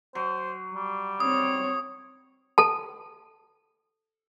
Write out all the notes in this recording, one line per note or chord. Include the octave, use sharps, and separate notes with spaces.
F#3 C5
G3
C4 C#5 D#6
A4 A5